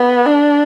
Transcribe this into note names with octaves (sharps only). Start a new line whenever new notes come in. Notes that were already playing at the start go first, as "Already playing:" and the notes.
Already playing: B3
D4